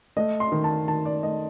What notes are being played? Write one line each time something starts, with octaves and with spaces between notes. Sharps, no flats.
A3 D#5
C6
D#3
A5
D#3 A5
D5
A3 D#5